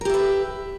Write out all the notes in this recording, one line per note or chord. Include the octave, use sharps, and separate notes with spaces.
G4 A#4 B4 E5